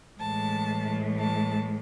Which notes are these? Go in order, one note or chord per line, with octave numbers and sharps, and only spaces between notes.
A2 E3 G#3 A5
A5